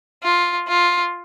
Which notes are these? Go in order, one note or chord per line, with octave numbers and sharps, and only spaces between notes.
F4
F4